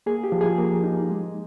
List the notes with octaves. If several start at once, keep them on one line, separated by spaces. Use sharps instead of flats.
A#3 G#4
G4
F3
G#4
A#3
D#4
G#3